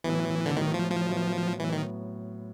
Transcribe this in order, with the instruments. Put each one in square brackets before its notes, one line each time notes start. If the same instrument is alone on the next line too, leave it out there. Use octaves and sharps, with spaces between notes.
[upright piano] A2 F#3 B3 [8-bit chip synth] E3
[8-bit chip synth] D3
[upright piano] A2 F#3 B3 [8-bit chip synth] D#3
[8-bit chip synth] F3
F3
[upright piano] A2 F#3 B3
[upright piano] A2 F#3 B3 [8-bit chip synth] E3
[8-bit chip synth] D#3